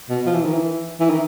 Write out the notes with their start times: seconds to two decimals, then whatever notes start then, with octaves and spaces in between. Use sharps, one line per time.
0.10 B2
0.26 F3
0.34 E3
0.44 D#3
0.54 E3
1.00 E3
1.10 D#3